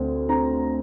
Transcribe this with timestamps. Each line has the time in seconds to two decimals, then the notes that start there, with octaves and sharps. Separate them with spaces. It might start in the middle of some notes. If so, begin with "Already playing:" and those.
Already playing: D2 C4
0.29 C4 A#5